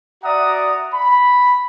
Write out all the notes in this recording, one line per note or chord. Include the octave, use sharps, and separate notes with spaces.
F#4 D5 E5 F#5 A#5 D#6
B5